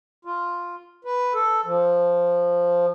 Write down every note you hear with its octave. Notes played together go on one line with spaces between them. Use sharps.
F4
B4
A4
F3